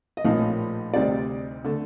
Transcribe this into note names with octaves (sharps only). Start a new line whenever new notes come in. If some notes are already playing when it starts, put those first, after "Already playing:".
D#5
A#1 A2 F3 A#3 D#4 F5
D2 C3 G3 C4 D#4 D5
D3 A3